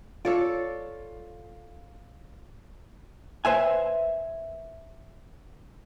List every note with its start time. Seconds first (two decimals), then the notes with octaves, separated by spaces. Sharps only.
0.25 F4 A4 C#5 D5
3.45 B4 C5 E5 G#5